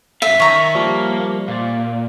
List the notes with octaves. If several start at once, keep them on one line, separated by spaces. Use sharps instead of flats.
F#2 E5 F5
D#3 C#5 A#5
F3 G3 A#3
A#2 D5 F5